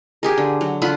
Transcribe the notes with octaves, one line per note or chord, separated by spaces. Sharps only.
G4 G#4 A#4
D3
F#3
D3 F4 F#5 B5